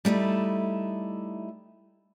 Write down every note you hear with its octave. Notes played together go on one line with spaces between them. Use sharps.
G3 A3 D#4 E4